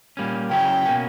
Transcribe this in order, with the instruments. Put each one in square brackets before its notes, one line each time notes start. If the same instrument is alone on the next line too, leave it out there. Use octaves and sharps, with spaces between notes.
[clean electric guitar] A#2 G3 A#3 C#4
[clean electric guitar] C#3 F#3 C#4 E4 [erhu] G5
[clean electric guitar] B2 A#3 C#4